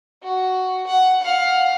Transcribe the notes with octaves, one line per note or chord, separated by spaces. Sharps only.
F#4
F#5
F5 F#5